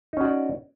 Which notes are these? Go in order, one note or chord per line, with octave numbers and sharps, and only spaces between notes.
C#4 D#4 F#4 D5